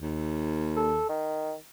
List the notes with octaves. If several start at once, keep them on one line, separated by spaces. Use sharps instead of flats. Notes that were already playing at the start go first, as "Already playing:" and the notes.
D#2
A4
D#3